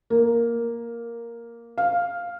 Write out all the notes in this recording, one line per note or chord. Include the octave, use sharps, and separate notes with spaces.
A#3
F5